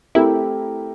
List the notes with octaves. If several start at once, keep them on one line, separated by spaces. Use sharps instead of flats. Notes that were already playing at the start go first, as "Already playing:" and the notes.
A3 C4 E4 G4 A#4